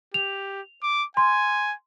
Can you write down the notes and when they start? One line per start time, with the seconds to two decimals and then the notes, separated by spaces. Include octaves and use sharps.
0.14 G4 F7
0.83 D6
1.17 G#5 C6